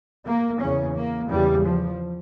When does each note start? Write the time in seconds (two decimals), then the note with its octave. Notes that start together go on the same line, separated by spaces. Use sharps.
0.24 A#3
0.59 E2 C#3 C#4
0.94 A#3
1.28 E2 C#3 G3
1.63 F3